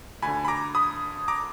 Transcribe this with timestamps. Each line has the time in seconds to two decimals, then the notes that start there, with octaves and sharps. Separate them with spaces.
0.22 D2 D3 G#5 B5
0.45 B5
0.48 A#5 D6
0.75 B5 D#6
1.28 A#5 D6